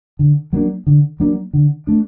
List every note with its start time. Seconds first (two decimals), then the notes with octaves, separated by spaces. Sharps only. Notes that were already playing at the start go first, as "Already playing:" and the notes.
0.19 D3
0.53 F#3 A#3 D4
0.87 D3
1.20 F#3 A#3 D4
1.53 D3
1.87 A3 D4